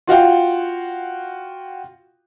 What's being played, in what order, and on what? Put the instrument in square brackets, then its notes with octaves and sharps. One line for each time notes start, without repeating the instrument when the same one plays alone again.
[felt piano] F4 F#4 F5 G5